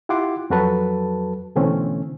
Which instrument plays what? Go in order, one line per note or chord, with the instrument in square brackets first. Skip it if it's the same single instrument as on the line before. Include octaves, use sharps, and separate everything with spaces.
[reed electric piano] E4 F4 G4 F#5 C6 D6
F2 F#3 F#4 A4 B4 A5
B2 D3 E3 A3 C4 C#4